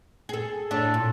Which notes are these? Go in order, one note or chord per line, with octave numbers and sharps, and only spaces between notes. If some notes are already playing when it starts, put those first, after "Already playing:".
G#4 A4
A2 D4 A4
A#2